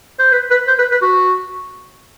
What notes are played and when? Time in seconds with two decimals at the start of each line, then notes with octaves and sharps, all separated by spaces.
0.19 C5
0.33 B4
0.51 B4
0.68 C5
0.79 B4
0.92 B4
1.02 F#4